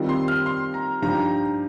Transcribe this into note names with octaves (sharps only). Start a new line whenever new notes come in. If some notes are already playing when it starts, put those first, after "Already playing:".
Already playing: D#3 G3 C4 F4
C6
F6
C6
A#5
G2 F3 D#4 G4 A#5